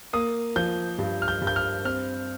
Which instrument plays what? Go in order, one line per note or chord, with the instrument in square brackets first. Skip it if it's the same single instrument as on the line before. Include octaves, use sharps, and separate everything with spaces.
[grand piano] A#3 D#6
F3 G6
G2
F6
G6
G2
G6
F6
C4 F6